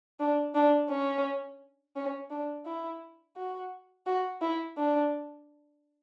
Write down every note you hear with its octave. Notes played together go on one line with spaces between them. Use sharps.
D4
D4
C#4
C#4
D4
E4
F#4
F#4
E4
D4